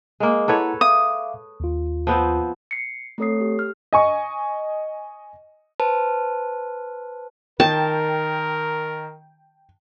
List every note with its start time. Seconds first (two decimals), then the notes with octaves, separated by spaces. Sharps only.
0.20 G#3 A#3
0.48 E4 A4 B4 C#5 F#5 A#5
0.81 E5 F5 D6 D#6
1.60 D#2 F4
2.07 F3 B3 C4
2.71 C7 C#7
3.18 A3 C4 A4 C#5 D#6 C7
3.41 G4
3.59 F6
3.93 D#5 G#5 C#6
5.80 B4 C5 A5
7.60 D#3 A#4 G5 A5